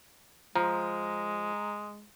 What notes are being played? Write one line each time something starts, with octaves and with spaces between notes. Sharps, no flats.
F3 G#3 A#5